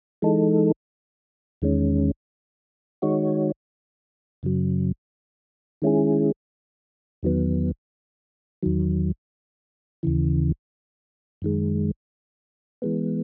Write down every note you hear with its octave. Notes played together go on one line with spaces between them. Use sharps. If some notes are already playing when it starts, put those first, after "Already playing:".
E3 G#3 D#4 A4
E2 D#3 G#3 C#4
D#3 G#3 D#4 F#4 C#5
F#2 C#3 F#3
D#3 G#3 C#4 E4 G#4
E2 D#3 F#3 B3
E2 D#3 F#3
D#2 C#3 E3
F#2 D#3 G#3
E3 G#3 B3